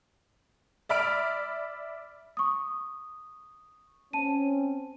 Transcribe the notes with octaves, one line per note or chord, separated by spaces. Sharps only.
D5 E5 B5 F6 D7
C#6 D#6
C4 C#4 A5 D#7